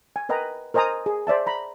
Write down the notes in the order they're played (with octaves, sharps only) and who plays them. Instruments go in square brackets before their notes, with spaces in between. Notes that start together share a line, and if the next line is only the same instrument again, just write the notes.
[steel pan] G#5
A#4 B4 D#5 G5 A#5
A#4 C5 D#5 G#5 A#5 D#6
G#4
C5 D5 E5 A5
A#5 B5